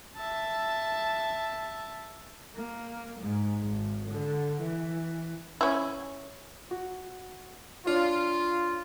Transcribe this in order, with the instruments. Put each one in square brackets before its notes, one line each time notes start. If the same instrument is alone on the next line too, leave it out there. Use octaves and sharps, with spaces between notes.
[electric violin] E5 A5
[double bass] A#3
G#2
G#1
D3
E3
[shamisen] C#4 E4
[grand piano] F#4
[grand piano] D4 C#5 [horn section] F4